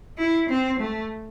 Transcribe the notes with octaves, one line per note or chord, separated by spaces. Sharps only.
E4
C4
A3